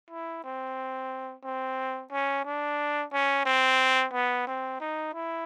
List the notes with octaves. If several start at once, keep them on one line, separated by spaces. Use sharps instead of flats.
E4
C4
C4
C#4
D4
C#4
C4
B3
C4
D#4
E4